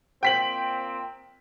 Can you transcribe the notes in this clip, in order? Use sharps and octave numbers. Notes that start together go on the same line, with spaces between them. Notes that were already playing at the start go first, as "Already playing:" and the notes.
A#2 C4 G5 B6 F#7